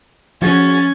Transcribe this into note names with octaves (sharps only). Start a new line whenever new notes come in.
F3 C#4 F#4 G#4 G#6 A6